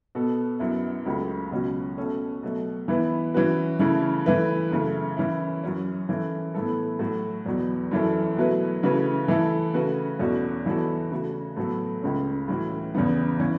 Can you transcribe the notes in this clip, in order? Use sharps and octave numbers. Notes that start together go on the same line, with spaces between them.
B2 B3 A4
F#2 F#3 B3 E4
C#2 C#3 F#3 A3
C#2 B2 F#3 C#4 F#4
B2 A3 C#4 A4
B2 F#3 A3
E3 B3 E4 B4
E3 C#4 F#4 B4
C#3 E3 A3 E4 A4
E3 A3 E4 B4
F#2 C#3 A3
E3 C#4 E4
F#2 F#3 C#4
E3 C#4 E4 A4
A2 E3 B3 A4
A2 F#3 A3 F#4
E2 B2 F#3 B3
F#2 E3 C#4 E4 A4
B2 F#3 A3 E4 B4
C#3 E3 A3 F#4 B4
E3 A3 E4 A4
C#3 A3 F#4 B4
E2 B2 A3 C#4 F#4
E3 B3 F#4 A4
C#3 A3 F#4
A2 F#3 B3 F#4 A4
C#2 C#3 A3 C#4
A2 E3 C#4 F#4
E2 C#3 E3 B3
E3 C#4